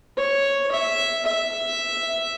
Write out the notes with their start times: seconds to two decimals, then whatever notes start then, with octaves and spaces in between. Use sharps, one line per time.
0.17 C#5
0.72 E5
1.26 E5